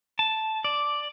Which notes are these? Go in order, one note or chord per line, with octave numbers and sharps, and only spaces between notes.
A5
D5